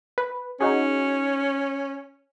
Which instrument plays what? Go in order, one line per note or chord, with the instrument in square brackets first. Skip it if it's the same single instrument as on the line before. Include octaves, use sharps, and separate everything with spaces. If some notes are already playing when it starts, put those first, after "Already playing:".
[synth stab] B4
[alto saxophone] C#4 [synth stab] D#4 F#4 G#4